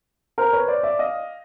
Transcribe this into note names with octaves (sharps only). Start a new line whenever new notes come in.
A#4 C5
B4 C#5
C5 D5
D5 E5
D#5 F5